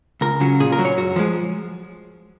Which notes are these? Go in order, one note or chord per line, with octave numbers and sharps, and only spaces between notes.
C#2 A#4
C#3 F#3
A#2 G#4
A#4
F#3
C#5
F#2 F#4
F3 G#3